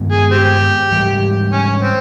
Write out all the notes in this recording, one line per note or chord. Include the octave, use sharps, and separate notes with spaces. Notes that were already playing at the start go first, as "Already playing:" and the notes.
Already playing: G2 D#3 G#3 B3
G#4
C4 G4
G#2 E3 G3
C#4
C4